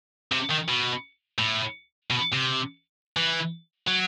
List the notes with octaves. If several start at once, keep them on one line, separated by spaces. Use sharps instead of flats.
C3
D#3
B2
A2
B2
C3
E3
F#3